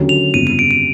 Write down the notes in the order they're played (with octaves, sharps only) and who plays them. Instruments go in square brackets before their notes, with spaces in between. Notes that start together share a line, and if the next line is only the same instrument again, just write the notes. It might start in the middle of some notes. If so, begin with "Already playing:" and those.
Already playing: [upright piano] D#2 D3 F#3 A#3 C#4
[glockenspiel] F7
[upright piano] G1 F2 C#3 [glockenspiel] D#7
[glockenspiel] D#7
D7
D#7